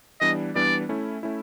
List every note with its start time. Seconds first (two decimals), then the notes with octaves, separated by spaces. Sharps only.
0.21 E3 G3 B3 D4 D#5
0.55 E3 G3 B3 D4 D5
0.89 A3 C#4 E4
1.23 A3 C#4 E4